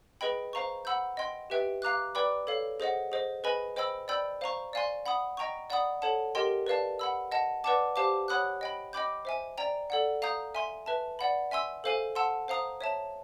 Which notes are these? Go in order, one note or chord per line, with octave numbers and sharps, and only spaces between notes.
G#4 B4 D#5 G5 B5
C5 F5 A#5 C#6
F#5 B5 E6 G6
D#5 G5 C6
G4 B4 E5 G5
F5 A#5 D6 F#6
B4 D5 G5 B5 D6
A4 C#5 F5
G#4 C5 D#5 F#5
G#4 C5 D#5
G#4 B4 D#5 G#5 B5
C5 D#5 G5 B5 E6
D5 G5 B5 E6 G6
C5 F5 A#5 C#6
D5 F5 G#5 C6
F#5 B5 D#6
D#5 G5 A#5 C#6
D5 F#5 B5 D#6
A4 C#5 F#5 A5
G4 A#4 D#5 G5 C6
B4 D5 F5 A5
F#5 B5 E6
D#5 F#5 A5
B4 D5 F#5 A5 D6
G4 C5 F5 A5 D6
C#5 F#5 B5 D#6 F#6
D#5 G5 B5
D#5 G5 B5 D6 G6
C5 E5 G#5
D5 G5 A#5
A4 D5 F#5
F5 A#5 D#6 G6
E5 G#5 C6
B4 E5 A5
D5 F#5 B5
E5 G#5 C6 E6
A4 C5 F5 G#5
F#5 A5 C6 E6
C5 F5 A#5 D#6
C#5 E5 A5